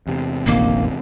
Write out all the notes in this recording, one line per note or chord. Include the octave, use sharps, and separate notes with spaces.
E2 C3
F1 A#1 D#3 A#3